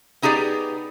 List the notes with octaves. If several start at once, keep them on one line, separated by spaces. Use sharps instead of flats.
B3 D#4 G4 G#4 D5